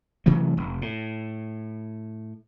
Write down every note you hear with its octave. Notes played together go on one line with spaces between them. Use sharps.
C3 E3 F#3 A3
F1
A2